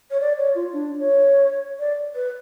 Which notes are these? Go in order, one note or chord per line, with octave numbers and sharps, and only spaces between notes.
C#5
D5
C#5
F4
D4
C#5
D5
B4